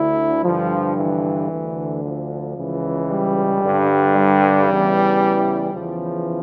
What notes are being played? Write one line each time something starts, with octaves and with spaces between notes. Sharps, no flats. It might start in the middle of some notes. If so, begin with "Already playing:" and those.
Already playing: D2 D3 E4
G2 D3 F3
E3
D2 D3
F3
C#2 C#3 E3
G3
G2 D3
G3
E2 C#3 E3
E2 C#3 E3 F3